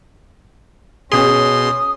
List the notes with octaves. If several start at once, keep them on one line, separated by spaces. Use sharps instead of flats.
B2 C#4 G#4 C6 D#6